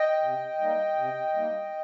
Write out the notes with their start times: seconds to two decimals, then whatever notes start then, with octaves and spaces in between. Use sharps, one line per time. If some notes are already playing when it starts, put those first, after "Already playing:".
Already playing: D#5 G5
0.21 C3
0.59 G3 A#3 D#4
0.96 C3
1.34 G3 A#3 D#4